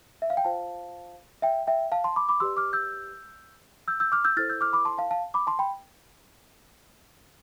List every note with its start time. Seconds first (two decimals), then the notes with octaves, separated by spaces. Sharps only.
0.22 E5
0.30 F5
0.37 G5
0.44 F4 C5 F5 A5
1.42 E5 G5
1.67 E5 G5
1.92 F5 A5
2.04 A5 C6
2.16 B5 D6
2.29 B5 D6
2.40 G4 B4 D5 C6 E6
2.57 D6 F6
2.73 E6 G6
3.88 E6 G6
4.00 E6 G6
4.12 D6 F6
4.24 E6 G6
4.37 E4 A4 C5 F6 A6
4.50 E6 G6
4.61 D6 F6
4.73 B5 D6
4.85 A5 C6
4.98 F5 A5
5.11 F5 A5
5.34 B5 D6
5.47 A5 C6
5.59 G5 B5